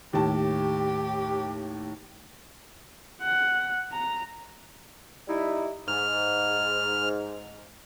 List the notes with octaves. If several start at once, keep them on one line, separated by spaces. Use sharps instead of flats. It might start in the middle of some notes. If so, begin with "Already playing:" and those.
D#2 A2 G4 A5
F#5
A#5
G3 D#4 E4
G#2 F6